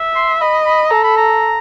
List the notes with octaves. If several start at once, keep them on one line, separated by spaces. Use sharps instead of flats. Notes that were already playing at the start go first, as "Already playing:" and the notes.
Already playing: E5
C6
D#5 B5
B5
A4 A#5
B5
A#5